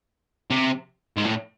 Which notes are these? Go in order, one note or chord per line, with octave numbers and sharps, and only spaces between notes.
C3
G#2
A2